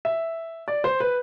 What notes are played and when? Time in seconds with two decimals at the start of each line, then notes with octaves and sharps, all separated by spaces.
0.05 E5
0.68 D5
0.84 C5
1.00 B4